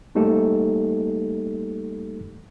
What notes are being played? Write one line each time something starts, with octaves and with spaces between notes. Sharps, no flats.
G3 A3 A#3 D#4 G4 A4